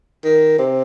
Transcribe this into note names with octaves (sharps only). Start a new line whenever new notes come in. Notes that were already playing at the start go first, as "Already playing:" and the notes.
D#3
C3